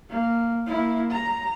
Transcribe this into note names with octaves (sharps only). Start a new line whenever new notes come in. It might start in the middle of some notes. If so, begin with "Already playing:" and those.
A#3
A#3 E4
A#5